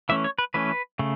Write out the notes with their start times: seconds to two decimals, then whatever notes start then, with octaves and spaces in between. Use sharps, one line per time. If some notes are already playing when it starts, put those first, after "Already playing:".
0.09 E3 A3 C#4 E5
0.24 C#5
0.39 B4
0.54 E3 A3 C#4 B4
0.99 C#3 A3